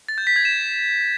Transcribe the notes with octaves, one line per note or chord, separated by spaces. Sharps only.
A6
G6
B6
G#6
E7